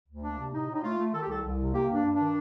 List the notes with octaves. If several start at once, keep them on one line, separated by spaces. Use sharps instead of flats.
D2
A#3 D4
C3
A2 D#4
A2
D#4
A3 F4
A3
D#3 A4
G4
C2 A4
C2
C3
A#3 G4
G2
D4
G2
D4
D#3